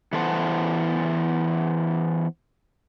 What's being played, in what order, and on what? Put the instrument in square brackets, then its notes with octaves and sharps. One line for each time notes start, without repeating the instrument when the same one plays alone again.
[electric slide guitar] E3 B3 A4 C5 F#5